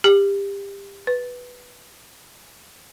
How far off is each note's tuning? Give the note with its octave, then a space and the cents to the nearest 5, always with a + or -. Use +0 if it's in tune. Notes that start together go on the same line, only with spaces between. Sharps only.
G4 +25
B4 +0